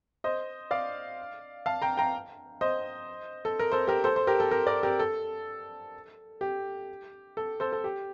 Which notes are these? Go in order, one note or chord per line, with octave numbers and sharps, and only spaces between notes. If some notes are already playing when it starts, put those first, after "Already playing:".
C5 D#5
D5 F5
F5 A5
G5 A#5
G5 A#5
C5 D#5
A4
A#4
A4 C5
G4 A#4
A4 C5
C5
G4 A#4
A4
G4 A#4
A#4 D5
G4 A#4
A4
G4
A4
A4 C5
A4
G4